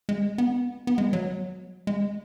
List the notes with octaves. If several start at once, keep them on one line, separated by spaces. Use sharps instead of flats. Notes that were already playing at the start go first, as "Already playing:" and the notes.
G#3
B3
B3
G#3
F#3
G#3